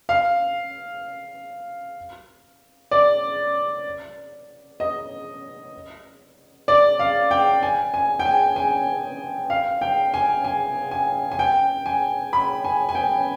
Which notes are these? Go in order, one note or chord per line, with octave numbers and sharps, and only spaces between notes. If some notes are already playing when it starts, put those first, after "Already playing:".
F5
D5
D#5
D5
F5
G5
G#5
G#5
G5
G#5
G#5
F5
G5
G#5
G#5
G#5
G#5
G5
G#5
B5
G#5
G#5
G5